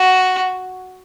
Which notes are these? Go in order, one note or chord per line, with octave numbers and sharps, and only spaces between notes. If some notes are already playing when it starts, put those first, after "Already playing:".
Already playing: F#4